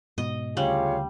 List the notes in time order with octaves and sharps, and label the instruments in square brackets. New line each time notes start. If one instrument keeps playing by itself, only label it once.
[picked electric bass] G#2 B2 [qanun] D#5
[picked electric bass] D2 C#3 [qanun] G3 [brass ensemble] F4 G#4 F5 [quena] C#5